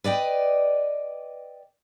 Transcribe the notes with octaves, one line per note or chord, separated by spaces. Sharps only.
B4 D5 D#5 G5